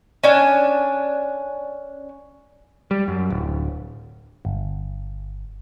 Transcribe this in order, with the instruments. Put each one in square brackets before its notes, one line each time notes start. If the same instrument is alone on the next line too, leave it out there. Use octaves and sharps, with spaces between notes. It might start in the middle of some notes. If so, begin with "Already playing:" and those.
[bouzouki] C#4 D4 G#5
[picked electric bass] G3
F#2
D1
[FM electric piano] G1